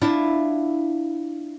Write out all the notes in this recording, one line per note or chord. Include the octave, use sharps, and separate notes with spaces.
D4 E4 F4